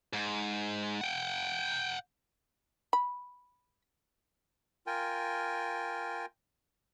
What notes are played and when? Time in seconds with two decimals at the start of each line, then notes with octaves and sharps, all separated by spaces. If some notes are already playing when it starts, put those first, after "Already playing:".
0.13 G#2
1.01 F#5 G5
2.93 B5
4.87 F4 A#4 G5 G#5